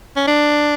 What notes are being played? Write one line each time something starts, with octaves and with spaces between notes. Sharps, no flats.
C#4
D4